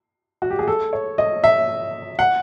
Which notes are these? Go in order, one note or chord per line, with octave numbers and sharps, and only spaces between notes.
F#4
G4
G#4
A4
C#5
D#5
E5
F#5